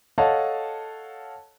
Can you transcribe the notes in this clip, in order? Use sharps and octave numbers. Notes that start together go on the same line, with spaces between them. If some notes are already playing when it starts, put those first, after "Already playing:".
A4 C#5 D#5 F5 F#5 A5